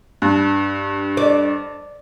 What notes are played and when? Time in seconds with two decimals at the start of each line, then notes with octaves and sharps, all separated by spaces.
0.22 G2
1.17 D5